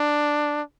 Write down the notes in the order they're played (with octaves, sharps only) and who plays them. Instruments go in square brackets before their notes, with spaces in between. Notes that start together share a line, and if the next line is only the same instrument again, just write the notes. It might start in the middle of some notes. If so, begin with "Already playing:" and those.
Already playing: [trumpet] D4